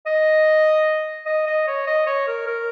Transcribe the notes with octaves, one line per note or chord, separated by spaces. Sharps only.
D#5
D#5
D#5
C#5
D#5
C#5
A#4
A#4